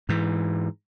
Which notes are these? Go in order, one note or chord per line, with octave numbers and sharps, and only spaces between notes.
G#2 E3